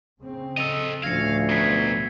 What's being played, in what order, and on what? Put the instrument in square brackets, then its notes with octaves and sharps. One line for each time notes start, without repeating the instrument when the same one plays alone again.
[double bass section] C#3 C4
[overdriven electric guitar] A4 D#5 [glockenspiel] E6 F7
[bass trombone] D2 [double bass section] A2 F3 C#4 [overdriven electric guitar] F5 [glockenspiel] G#6 A#6 C#7
[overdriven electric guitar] F#3 B3 [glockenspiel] G#6 B6 C7